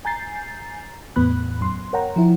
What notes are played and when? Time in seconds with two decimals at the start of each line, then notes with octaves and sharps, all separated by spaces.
0.05 G#5 A#5 G6 A6 C7
1.16 E2 A2 B3 B5 F#6
1.61 F#2 C6
1.93 A#4 C#5 F#5 G5 A#5
2.16 F3 E4